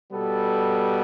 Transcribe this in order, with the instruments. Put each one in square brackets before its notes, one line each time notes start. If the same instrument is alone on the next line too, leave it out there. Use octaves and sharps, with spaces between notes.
[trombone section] B2 G3 B3 A4